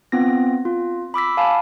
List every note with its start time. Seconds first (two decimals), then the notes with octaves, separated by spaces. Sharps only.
0.12 B3 C4 F4 A#6
0.65 F4
1.14 B5 D6 E6 B6
1.37 F5 G#5 A5 B5